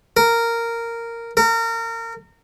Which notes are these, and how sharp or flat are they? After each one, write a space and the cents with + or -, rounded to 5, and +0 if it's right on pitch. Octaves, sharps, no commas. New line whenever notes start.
A#4 -10
A#4 -30